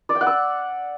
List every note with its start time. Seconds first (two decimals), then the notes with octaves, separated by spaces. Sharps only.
0.09 D5
0.15 G5
0.21 F#5
0.27 E6